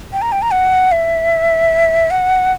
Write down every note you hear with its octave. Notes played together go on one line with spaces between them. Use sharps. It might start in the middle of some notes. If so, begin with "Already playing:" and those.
G5
A#5
G5
A#5
F#5
E5
F#5